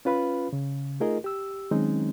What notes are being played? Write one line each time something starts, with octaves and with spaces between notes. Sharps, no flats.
C#4 F4 B4 F5 B5
C#3
A3 D#4 F4 G#4 A#4 D#5
G4 E6
D#3 F#3 G#3 C4 C#4 D#4